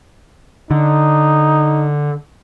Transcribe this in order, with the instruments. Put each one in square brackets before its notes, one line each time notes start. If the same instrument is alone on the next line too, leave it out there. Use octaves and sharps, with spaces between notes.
[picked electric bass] D3 [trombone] D#4